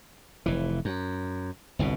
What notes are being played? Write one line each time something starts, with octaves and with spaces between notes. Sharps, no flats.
F1 E3
F#2
G1 C2 B2